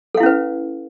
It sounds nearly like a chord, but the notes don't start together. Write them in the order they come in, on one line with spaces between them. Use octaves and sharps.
A4 F5 E4 C#4 B4